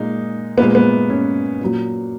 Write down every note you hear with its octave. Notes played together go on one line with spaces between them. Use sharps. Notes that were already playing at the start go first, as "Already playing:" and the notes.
Already playing: A#2 G#3 D#4
A#2 G#3 B3
B3
C#4
A#2 F#3